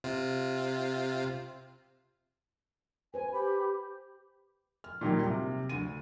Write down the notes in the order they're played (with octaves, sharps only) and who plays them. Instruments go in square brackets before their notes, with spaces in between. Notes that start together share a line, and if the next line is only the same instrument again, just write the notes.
[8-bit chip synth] C3 F4
[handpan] B4 C5 [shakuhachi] G#5
[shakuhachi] G4 [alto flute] B5
[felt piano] F6
A#2 D#3 F#3 G3
C3
D2 D#7